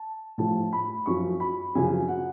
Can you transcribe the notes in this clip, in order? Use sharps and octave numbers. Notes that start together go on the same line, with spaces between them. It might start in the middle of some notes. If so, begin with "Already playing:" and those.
Already playing: A5
A2 F3 A5
B5
F#2 F3 C#6
B5
F#2 C#3 F3 G#5
F#5